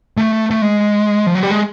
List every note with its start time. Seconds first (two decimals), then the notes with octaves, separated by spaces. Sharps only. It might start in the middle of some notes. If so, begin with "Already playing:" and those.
0.17 A3
0.51 A3
0.62 G#3
1.26 F3
1.35 F#3
1.43 G3
1.51 G#3